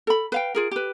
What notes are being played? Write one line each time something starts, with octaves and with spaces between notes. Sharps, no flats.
A4 B5
B4 F5 G5
F4 G#4 A#4
G4 B4